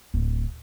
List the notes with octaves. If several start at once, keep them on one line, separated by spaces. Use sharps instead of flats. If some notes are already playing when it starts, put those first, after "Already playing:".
D1